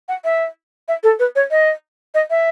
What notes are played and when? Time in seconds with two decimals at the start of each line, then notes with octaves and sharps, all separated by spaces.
0.09 F#5
0.24 E5
0.88 E5
1.03 A4
1.19 B4
1.36 C#5
1.51 D#5
2.14 D#5
2.30 E5